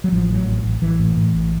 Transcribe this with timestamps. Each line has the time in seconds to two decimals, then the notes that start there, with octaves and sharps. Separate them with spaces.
0.04 F#3
0.12 A1 F3
0.29 A2
0.34 F#3
0.46 A1
0.64 A1
0.81 A1 E3
0.99 A2
1.17 A2
1.33 A1